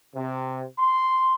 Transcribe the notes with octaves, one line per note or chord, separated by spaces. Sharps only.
C3
C6